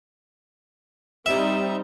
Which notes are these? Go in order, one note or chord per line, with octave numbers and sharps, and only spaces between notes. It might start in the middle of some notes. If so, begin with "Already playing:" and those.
G3 C4 D#4 E5